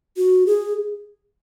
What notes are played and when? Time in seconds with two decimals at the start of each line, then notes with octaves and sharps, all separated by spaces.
0.17 F#4
0.47 G#4